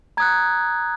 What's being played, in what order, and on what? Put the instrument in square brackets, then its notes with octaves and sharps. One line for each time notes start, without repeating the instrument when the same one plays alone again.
[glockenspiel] A#5 D#6 F#6 G#6